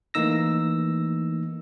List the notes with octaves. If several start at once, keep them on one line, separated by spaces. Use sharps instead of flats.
E3 A3 A#3 D#4 E6 A#6